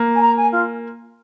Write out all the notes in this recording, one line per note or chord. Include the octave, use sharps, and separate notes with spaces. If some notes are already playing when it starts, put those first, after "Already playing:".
Already playing: A#3
G#5
A#5
G#5
F4